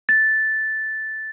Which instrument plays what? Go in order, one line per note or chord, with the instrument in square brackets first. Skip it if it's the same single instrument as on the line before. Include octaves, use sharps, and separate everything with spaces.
[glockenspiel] A6